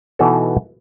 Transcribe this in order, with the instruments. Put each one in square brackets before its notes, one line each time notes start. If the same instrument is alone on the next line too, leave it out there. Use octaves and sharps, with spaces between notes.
[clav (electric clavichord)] B2 E3 B3 D#4 F#4 A4